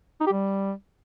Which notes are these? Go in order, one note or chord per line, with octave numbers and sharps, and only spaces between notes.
D#4
G4
G3